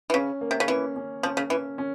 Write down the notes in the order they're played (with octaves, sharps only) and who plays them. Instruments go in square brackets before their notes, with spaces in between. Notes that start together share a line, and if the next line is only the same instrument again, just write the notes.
[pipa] E3
[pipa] C#3 [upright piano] C#4
[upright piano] A#3
[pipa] C3
C#3
[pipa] E3 [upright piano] C#4
[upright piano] C#4
[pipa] F3 [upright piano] C#4
[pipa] C#3
[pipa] E3 [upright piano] C#4
[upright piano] C#4